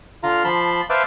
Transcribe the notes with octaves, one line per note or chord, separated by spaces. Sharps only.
D3 F4 F5 A#5
F3 A5 B5 C6
B4 C5 E5 F5 A5 D6